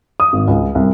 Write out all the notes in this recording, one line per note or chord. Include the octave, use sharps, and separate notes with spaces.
D#6
G#1
C#2
C2